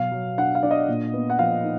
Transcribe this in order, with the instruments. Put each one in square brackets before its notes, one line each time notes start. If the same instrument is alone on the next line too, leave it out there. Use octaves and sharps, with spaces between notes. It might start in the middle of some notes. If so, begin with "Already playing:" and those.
Already playing: [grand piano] B2 F#3 F5
F#3
D4 F#5
F5
D4 D5
D#5
A#2
B3
F#5
F3 F5
D#4